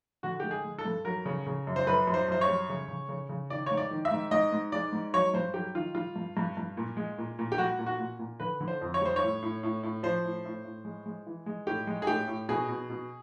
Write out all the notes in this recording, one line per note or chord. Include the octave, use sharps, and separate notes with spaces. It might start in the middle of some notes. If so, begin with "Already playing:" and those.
D3 F#4
G#3 G4
G#4
G#3
A4
G2
F#3 A#4
C#3
C#3
F#2
C5
F#2 B4
F#2
C5
F#2 C5
C#5
G3
C#3
C#3
C#3
C#3
D#3 D5
G#2 C#5
D5
D#3
E5
G#2
G#2 D#5
G#2
G#3 D5
G#2
F#3 C#5
G2 C5
F#3 G4
D#3 F4
G3 F4
G2
G2
G2
A#2
G#3
A#2
A#2
G4
G3 F#4
A#2
F#4
A#2
A#2
D3 B4
D3
C5
F2
C#5
G3 C5
C#5
A2
A2
A2
A2
F3 C5
A2
A2
A2
G#3
G#3
E3
G#3
A2 G4
G#3
G#4
A2 G4
A2
B2 G#4
B2
B2